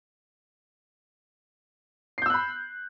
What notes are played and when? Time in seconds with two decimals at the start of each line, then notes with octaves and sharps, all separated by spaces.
2.18 C7
2.22 G6
2.26 E6
2.30 F#6
2.34 B5